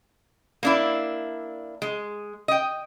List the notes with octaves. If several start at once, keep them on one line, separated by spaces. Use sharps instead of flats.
A#3 D4 E4
G#3
D#5 G5